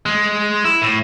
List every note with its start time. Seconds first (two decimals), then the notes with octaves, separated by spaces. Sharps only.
0.06 G#3
0.65 E4
0.82 A2